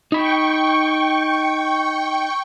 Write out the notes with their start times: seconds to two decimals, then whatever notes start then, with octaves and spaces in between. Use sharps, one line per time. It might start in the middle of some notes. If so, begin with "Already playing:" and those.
0.12 D#4 G5 B5 C#6